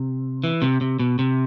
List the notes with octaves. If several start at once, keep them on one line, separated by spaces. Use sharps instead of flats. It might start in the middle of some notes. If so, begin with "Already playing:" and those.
Already playing: C3
E3
C3
C3
B2
C3